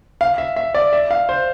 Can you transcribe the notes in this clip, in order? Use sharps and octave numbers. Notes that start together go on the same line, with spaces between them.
F5
E5
E5
D5
E5
F5
C5